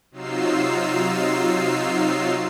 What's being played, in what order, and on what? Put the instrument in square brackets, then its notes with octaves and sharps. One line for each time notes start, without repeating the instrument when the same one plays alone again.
[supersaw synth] C3 F#3 D#4 F4 E6 C7